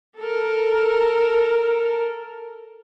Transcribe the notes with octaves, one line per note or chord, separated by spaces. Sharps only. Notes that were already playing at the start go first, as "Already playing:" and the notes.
A4 A#4